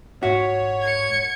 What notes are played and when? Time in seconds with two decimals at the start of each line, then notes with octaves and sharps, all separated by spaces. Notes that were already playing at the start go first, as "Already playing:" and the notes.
0.23 G#2 F#4 C#5 E5
0.82 G#6 C#7